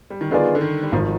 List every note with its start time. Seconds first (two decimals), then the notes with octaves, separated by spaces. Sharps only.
0.10 G3
0.21 D#3
0.31 D3 D#3 B3 F4 G#4 D5
0.55 D3
0.61 D#3
0.83 G3
0.92 G#1 G#2 D#3 F3